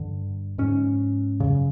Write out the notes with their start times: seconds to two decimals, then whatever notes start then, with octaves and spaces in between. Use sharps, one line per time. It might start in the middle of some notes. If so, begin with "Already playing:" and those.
Already playing: G2 D3
0.58 G#2 C#4
1.40 F#2 C#3